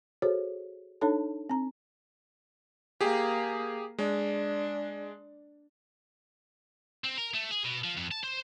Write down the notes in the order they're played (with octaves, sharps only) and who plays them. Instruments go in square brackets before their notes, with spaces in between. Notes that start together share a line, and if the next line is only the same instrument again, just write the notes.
[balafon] F#4 G#4 A4 C5 C#5
D4 D#4 A4 C#5 A5
C4 A#5
[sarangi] A#3 [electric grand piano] G4 G#4
[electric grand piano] G#3 [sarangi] D4
[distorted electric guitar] C4
A#4
A3
G#4
B2
F3
F2
A5
C5